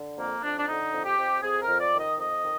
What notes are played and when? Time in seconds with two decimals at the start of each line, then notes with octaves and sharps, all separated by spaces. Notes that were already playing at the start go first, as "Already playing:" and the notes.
Already playing: D3
0.18 F2 A#3
0.43 F2 D4
0.59 D4
0.67 D3 D#4
0.93 F2
1.05 G4
1.18 F2
1.43 F2 G#4
1.62 A#4
1.68 F2
1.80 D5
1.93 D#3
2.00 D#5
2.18 F2 D#5
2.43 D#3